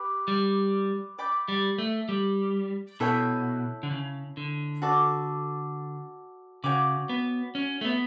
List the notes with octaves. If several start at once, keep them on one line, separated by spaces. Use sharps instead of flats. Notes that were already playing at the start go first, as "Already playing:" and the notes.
Already playing: G4 B4
G3
D5 G5 B5 D6
G3
A3
G3
B2 E4 A4 C#5 G5
D3
C#3
D3
F#4 A4 D5
C#3 F#4 C#5 G5 D6
B3
C#4
A3
B3